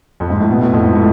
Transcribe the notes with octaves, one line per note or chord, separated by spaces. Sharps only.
F2
G#2
A2
B2
A2
F2
G#2
A2